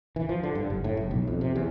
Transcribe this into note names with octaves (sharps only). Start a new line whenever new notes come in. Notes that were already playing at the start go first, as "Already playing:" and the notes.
E3
F3
D3
G2
F#1
A2
F#1
B1
F2
C3
E2